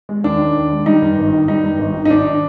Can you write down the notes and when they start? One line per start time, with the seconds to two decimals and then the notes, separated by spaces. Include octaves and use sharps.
0.09 G#3
0.24 D#2 D4
0.39 D#3
0.55 D#2
0.71 G#3
0.86 G3 D#4
1.02 G2
1.18 G#1
1.33 D#3
1.48 G3 D#4
1.64 G2
1.79 G#1
1.95 D#3
2.05 D#4
2.10 G#1 D4